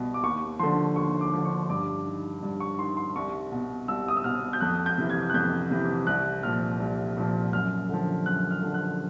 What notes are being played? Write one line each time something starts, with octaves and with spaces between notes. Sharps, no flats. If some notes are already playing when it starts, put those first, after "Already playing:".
Already playing: C2 B2
D6
D#2 C#6
D3 F3 C6
D#2 C#6
D6
D3 F3
C#6
G2 D6
D#3
G2
C#6
D#3 C6
C6
C2 C#6
B2
C2 E6
D#6
E6
B2 F6
G6
F2 F#6
G6
C3 E3
G#6
F#6
F2 G6
C3 E3
C2 F#6
A#2 F3 F6
C2
A#2 F3
F#2 F6
D3 F3
F#2 F#6
F6
D3 F3
F#6